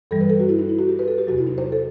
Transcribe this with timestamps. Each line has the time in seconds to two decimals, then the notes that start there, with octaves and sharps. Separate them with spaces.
0.11 G2 E3 G3 A4
0.21 B4
0.30 A4
0.40 F#4
0.49 E4
0.59 D#4
0.69 E4
0.79 F#4
0.89 G4
0.99 B4
1.08 A4
1.18 G4
1.27 E2 C3 F#3 F#4
1.38 E4
1.47 D#4
1.58 C5
1.72 A4